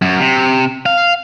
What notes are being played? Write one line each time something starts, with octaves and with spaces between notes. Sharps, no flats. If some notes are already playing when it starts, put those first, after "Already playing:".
F#2
C3
F5